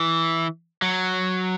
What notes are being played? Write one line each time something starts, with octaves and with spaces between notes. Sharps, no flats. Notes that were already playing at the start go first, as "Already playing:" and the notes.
Already playing: E3
F#3